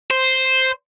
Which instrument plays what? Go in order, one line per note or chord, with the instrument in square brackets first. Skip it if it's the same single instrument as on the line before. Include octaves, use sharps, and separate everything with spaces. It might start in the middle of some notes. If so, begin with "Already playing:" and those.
[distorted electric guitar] C5